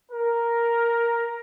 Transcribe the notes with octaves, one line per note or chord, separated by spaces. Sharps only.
A#4